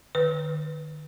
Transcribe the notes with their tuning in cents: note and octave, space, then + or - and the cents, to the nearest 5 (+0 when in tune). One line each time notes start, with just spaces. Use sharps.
D#3 -35 B4 +0